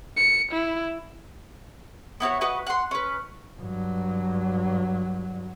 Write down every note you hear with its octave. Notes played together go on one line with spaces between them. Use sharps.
C#7
E4
B3 E4 F#4 C#5
F#4 B4 D#5
F#5 C6
C#4 B4
G2 F#3